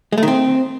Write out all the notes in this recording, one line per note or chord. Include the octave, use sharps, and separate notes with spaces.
G#3
A3
D#3
C4